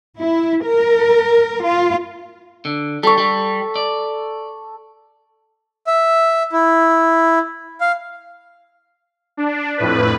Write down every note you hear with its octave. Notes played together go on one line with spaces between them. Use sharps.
E4
A#4
F4
D3
G3 A4 C#6
G3
D5
E5
E4
F5
D4
F2 A2 B4